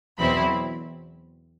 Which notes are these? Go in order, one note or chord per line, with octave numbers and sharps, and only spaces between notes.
E2 B2 F#3 C4 E4 B5